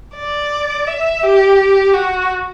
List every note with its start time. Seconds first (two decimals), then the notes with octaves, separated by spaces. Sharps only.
0.16 D5
0.87 E5
1.23 G4
1.93 F#4